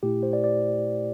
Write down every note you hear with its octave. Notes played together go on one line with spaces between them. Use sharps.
A#2 A3 E4 G4
C5
D5
D5